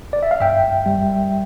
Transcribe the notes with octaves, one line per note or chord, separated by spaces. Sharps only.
D5
E5
F5
G2 E5 G5
G3